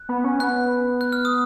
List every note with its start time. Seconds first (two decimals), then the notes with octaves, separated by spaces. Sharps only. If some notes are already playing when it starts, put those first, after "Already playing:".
Already playing: F#6
0.09 B3
0.24 C#4
0.39 B3 F#6
1.01 F#6
1.12 F6
1.25 D#6